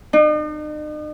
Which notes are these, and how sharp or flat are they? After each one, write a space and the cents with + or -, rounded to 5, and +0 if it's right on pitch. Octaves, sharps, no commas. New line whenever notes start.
D#4 -45